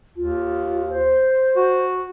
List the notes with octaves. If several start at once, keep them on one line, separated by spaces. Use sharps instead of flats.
D#2 F4
C5
F#4